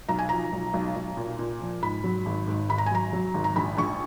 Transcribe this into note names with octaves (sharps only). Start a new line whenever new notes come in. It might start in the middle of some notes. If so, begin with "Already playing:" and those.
B1 A#5
G#5
F3 A#5
B1
B1
B1
A#2
A#2
F3
G#2 B5
F#3
G#1
G#2
G#1 B5
A#5
G#5
F#3 A#5
F#3
G#1
A#5
A#1 B5
A#1 C#6